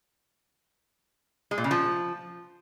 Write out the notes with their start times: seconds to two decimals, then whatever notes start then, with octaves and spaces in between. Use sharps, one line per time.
1.51 G#3
1.58 A#2
1.64 C#3
1.71 F3